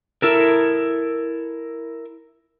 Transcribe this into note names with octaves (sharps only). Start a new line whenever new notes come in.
E4 A4 A#4